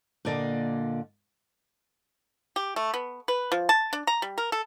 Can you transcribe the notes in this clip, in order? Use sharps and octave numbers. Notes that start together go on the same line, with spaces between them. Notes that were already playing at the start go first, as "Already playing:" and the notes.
A#2 D3 A#3 D5 D#5
G4
A3
B3
B4
F3
A5
D4
A#5
G3
A#4
A4